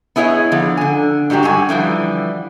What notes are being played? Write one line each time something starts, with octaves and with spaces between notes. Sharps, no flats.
B3 E4 G#4 C#5 D#5
D3 F3 B3
D3 G#5
G#2 D3 F#3 F#4 G4
G2 F#4 G#5
D3 E3 F3 G3